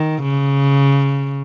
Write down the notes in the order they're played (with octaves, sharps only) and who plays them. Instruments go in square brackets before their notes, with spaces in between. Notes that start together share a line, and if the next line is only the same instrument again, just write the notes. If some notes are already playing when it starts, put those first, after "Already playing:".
Already playing: [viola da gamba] D#3
C#3